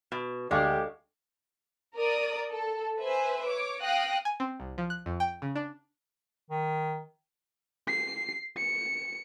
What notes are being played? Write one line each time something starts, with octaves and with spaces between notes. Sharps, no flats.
B2
D2 G#3 G4 D5 F5 C#6
A#4 D5 D#6
A4
B4 C5 E5 G#5
C#5 D6
F5 G5 D#6 F#6 A#6
G#5
C4
C2
F3
F#6
F2
G5
C#3
D4
D#3
C7
C#7